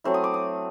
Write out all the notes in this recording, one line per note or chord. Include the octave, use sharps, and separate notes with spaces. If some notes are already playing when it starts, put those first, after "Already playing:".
F#3 A3 C4 E4
D#6
D6
D#6